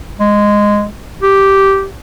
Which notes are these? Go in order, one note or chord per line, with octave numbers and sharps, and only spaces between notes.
G#3
G4